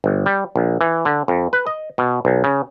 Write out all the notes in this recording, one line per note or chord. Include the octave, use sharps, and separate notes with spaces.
G1
G3
A#1
E3
D3
F2
B4
D#5
B2
B1
C#3